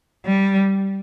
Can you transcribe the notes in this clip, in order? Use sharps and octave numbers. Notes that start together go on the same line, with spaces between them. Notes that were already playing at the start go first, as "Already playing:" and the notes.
G3